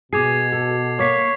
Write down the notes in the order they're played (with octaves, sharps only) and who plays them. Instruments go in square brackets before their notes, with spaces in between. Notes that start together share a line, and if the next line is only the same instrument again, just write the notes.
[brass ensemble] B2 [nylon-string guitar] G#4 [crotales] D6 G#6 C7
[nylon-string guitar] A4
[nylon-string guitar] A#3 [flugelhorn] C#5 [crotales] D6 B6 C7